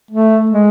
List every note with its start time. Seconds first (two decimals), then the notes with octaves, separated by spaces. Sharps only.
0.11 A3
0.50 G#3